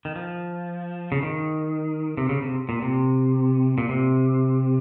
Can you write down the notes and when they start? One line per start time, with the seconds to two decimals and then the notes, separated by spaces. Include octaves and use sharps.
0.05 D#3
0.16 F3
1.12 C#3
1.23 D#3
2.17 C3
2.29 C#3
2.43 C3
2.69 A#2
2.82 C3
3.78 A#2
3.89 C3